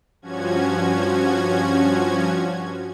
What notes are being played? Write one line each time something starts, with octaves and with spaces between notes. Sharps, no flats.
G2 F3 C#4 F#4 G#6